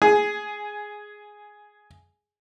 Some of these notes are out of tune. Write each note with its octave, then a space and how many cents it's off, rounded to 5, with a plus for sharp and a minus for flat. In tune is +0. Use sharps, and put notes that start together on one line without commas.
G#4 +0 G#5 +15